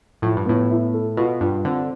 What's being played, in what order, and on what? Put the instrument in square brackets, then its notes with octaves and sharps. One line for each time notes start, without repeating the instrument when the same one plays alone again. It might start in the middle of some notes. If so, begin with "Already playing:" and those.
[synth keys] A2 [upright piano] F3
[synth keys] G2
[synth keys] A2 [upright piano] B3
[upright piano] E4
A4
[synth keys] B2 [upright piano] F4
[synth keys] G2 [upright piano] F4
[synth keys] D3 [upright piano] C4